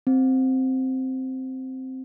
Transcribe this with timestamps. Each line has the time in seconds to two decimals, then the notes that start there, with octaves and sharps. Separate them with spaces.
0.07 C4